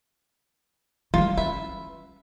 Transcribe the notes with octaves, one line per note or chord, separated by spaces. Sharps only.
D#3 G3 F4
C#4 B4 E5